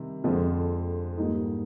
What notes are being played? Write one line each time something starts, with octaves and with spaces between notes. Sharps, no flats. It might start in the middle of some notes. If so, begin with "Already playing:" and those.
Already playing: C3 D#3 G3
F2 D3 F3 G#3 C4
G#2 G3 A#3 D#4